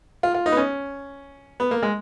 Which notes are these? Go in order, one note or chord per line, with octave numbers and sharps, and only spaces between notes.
F4
F4
D#4
B3
C#4
B3
A#3
G#3